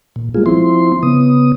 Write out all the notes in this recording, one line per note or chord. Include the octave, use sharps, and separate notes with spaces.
A#2
G3 G#3 A#3 F4 G#4
F3 C4 E4 C6
C#3 B3 D#6